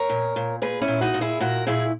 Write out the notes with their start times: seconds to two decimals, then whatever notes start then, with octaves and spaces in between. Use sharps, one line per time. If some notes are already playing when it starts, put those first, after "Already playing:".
Already playing: A#4 C#5
0.09 A#2
0.36 A#2
0.62 A#2 G#4 B4
0.81 C#4 E4
0.88 A#2
1.01 D#4 F#4
1.14 A#2
1.21 E4 G#4
1.40 A#2 F#4 A#4
1.67 A#2 E4 G#4